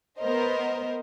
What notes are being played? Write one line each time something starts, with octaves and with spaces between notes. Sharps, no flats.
B3 A#4 C5 D#5